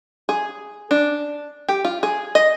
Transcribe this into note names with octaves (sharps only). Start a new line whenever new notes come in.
G#4
D4
G4
F4
G#4
D#5